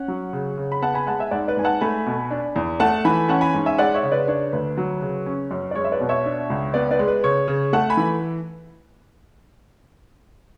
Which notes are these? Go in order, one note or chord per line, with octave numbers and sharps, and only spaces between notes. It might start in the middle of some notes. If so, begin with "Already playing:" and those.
Already playing: C#4 F#5
F#3
C#3
C#3
B5
B3 F#5 A5
G#5 B5
G#3 F#5 A5
E5 G#5
G#2 D5 F#5
B4 D5
G#2 G#5
F#5 A5
A3 G#5 B5
B2
D4
E2
A3 F#5 A5
E3 G#5 B5
C#4 F#5 A5
G#5 B5
G#2
E5 G#5
G#3 D5 F#5
C#5 E5
C#3
B4 D5
D4 C#5
D2 B4
F#3
C#3
C#4
F#2
D5
G#3 C#5
E5
B4 D5
B2
C#5 E5
D4
C#2
B3 B4 D5
B4 D5
G#3
B4
C#3 C#5
C#3
A3 F#5 A5
G#5 B5
E3